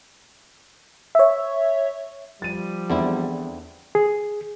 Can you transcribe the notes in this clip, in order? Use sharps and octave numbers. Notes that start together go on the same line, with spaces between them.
C#5 E5
F3 G3 A6 D#7
E2 D3 C4 E4
G#4